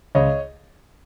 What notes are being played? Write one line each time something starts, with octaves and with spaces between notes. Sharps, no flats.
C#2 C#5 D#5